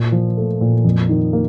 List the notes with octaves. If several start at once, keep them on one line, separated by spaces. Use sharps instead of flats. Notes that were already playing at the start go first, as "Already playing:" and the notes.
Already playing: A#2
F3
A3
A#2
F2
D#3
A#3